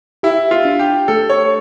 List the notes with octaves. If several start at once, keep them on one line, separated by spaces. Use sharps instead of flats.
E4 G4
F4
D4
G4
A3 A4
C#5